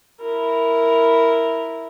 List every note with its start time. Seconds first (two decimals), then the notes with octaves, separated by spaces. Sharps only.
0.21 E4 A#4